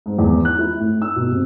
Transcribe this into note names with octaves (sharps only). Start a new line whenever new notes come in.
G#2
E2
F#6
E4
A2
E6
B2
C3